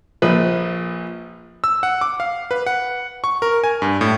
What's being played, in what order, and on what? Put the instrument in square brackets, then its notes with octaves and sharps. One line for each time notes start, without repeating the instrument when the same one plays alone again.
[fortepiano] A#1 F3 B4
[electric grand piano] E6
F#5
D6
F5
B4
F#5
C#6
A#4
G#5
G2
A2